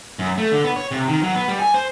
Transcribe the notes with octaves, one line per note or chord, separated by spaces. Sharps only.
F#2
A3
D3
B3
C#5
C3
D#3
F#3
B3
G3
G#5
C5